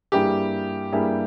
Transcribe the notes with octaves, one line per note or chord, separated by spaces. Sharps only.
G2 G3 A#3 E4 G4 G#4
G2 G3 A#3 E4 G#4